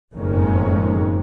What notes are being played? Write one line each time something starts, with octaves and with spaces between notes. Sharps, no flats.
F#1 F2 A2 D#3 G#3 C#4